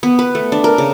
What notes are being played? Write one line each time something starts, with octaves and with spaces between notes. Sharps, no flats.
B3
B4
A3
D4
A#4
C#3